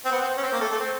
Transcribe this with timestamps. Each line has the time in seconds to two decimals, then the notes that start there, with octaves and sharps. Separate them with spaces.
0.05 C4
0.12 B3
0.21 C4
0.37 C#4
0.42 C4
0.52 A#3
0.61 A3
0.71 A3
0.79 C4